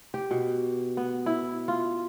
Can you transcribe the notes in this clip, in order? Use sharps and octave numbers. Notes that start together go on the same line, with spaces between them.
G4
B2
B3
E4
F4